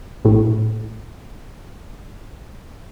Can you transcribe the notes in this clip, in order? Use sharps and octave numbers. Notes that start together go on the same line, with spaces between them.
A#1 A2